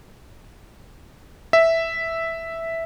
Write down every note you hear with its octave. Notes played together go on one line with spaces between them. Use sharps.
E5